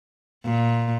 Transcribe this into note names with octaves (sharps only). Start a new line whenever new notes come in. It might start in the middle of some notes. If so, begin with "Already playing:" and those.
A#2